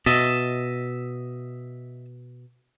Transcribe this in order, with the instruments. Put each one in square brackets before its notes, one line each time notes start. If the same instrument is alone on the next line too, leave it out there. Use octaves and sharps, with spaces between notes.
[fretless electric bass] B2 [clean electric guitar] D#5 E5 A5